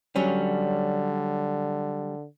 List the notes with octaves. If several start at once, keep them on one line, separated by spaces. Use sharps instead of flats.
D3 F#3 G3 C#4